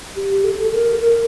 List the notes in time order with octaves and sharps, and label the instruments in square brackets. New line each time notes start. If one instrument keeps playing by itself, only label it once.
[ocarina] G4
A4
A4
A#4
A#4